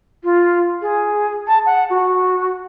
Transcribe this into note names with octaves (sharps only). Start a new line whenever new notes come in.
F4
G#4
A5
F#5
F#4